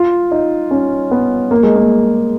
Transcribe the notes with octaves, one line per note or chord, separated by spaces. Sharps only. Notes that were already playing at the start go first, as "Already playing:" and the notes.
Already playing: F4
D#4
C#4
B3
A#3
G#3
A#3